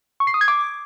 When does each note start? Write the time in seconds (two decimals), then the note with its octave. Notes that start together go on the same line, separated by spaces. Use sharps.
0.20 C#6
0.27 C7
0.34 D#6
0.41 G#6
0.48 D6